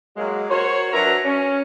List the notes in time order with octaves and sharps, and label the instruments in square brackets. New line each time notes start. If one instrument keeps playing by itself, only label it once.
[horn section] F#3 G#3 A#3
F#4 A#4 C5 C#5
F#3 D4 A#4 B4 E5 A#5
C#4